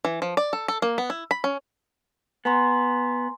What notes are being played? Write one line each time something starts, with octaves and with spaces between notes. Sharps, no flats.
E3
F3
D5
A4
A4
A#3
B3
E4
B5
C#4
B3 G#5 A#5 C6